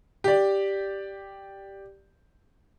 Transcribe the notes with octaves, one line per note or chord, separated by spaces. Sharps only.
G4 D5